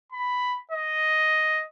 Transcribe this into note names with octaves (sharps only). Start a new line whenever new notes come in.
B5
D#5